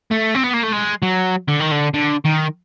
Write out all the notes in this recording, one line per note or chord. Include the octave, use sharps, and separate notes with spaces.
A3
C4
B3
A#3
A3
G#3
F#3
D3
D#3
D3
D3
D#3